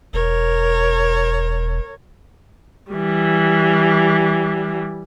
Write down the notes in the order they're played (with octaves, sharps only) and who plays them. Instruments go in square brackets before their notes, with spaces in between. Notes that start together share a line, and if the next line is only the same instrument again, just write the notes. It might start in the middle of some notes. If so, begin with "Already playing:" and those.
[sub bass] E1 [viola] A#4 C#5
[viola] E3 G3